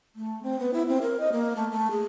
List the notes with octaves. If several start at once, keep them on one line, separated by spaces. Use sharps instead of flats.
A3
C4
B3
E4
C4
A#4
D#5
A#3
A3
A3
G#4